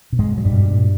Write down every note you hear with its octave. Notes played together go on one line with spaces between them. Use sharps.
B2
G#2 G#3
B2
F#3
G2 G3
B2
A#2